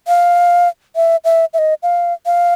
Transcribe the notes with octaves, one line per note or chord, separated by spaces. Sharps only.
F5
E5
E5
E5
D#5
F5
F5